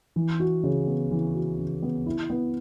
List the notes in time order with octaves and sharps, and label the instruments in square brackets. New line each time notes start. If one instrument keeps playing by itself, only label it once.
[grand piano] E3
F#4
C#3
B3
E3
F#4
C#3
B3
E4
B3